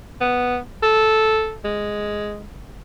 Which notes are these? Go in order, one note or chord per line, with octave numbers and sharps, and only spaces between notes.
B3
A4
G#3